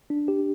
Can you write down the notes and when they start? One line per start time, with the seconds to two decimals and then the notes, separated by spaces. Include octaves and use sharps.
0.10 D4
0.28 G4